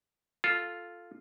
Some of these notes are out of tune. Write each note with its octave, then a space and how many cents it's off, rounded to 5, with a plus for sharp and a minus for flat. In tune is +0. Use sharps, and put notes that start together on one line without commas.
F4 +0 A4 +0